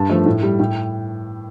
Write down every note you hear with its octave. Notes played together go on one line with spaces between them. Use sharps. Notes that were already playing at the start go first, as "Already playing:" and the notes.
Already playing: G2 A5
F3 A3
A2
G3
A2 G5